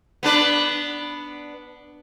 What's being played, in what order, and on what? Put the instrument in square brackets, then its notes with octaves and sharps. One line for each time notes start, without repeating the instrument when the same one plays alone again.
[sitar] B3 D4 B4